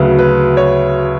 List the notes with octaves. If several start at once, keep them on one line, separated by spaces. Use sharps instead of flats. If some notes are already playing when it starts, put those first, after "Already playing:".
Already playing: D2 C#3 F#3 B4
B4
C#5